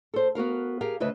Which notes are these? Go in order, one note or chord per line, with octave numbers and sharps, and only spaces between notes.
A4 C5
B3 F#4 A#4 F5
G4 G#4 A#4 F5
D2 C#3 B4 D#5 E5